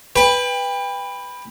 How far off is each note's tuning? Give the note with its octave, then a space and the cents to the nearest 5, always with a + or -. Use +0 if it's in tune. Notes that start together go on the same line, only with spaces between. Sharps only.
B4 +0 G5 +30